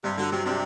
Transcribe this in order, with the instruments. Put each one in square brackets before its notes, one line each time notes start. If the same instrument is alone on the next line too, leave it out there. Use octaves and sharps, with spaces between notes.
[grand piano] G2 [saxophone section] C3
[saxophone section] D3 [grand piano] F#3
[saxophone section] C3 [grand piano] F#3
[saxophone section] C3 [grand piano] D4